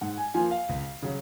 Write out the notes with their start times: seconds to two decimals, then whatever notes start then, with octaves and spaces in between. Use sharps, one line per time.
0.01 G#2 F#5
0.17 G#5
0.34 F3 A#3 F4 G#5
0.51 F5
0.69 C#2
1.03 C#3 F#3